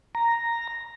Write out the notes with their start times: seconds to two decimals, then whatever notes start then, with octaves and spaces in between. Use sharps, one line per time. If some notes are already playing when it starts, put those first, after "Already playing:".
0.15 A#5